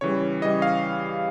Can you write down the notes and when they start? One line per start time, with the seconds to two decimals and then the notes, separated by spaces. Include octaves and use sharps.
0.01 C#3 E3 G3 C#5
0.42 C#3 E3 G3 D#5
0.62 F5